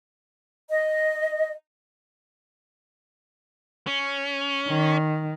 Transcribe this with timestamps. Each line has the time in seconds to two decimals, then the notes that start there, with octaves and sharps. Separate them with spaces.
0.69 D#5
3.87 C#4
4.68 D#3